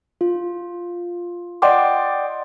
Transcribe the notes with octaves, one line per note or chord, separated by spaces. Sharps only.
F4
D5 D#5 F#5 G5 C6 D6